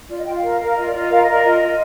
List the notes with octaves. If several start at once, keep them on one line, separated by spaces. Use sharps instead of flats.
F4 D5
D#5
F4 G5
F5
A#4
A#4
F4 D#5
D5
F4
D#5
A#4 F5
D#5
A#4
D5
F4 D#5
F4